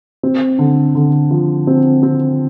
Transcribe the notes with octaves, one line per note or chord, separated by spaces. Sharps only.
C4
D3
D3
F3
C4
C4